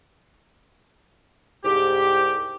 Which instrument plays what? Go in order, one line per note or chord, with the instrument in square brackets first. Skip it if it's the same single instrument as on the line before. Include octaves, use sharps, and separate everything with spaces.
[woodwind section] C2 G#2 G4